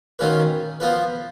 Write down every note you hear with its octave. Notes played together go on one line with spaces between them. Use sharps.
D#3 F#3 C#4 F4 B4
F3 B3 F4 B4